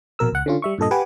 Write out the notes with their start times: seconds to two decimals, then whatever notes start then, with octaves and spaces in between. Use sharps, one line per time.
0.19 A#1 B2 A#4 E6
0.33 C#2 F#5
0.46 D3 C#4 F4
0.62 G3 E5 C#6
0.78 G2 A#2 A4 D#5
0.91 G4 B4 F#5 G#5 D6